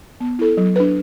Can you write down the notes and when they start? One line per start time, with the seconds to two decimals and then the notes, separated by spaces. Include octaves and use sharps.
0.20 B3
0.39 E4 A4
0.57 F#3
0.76 D4 B4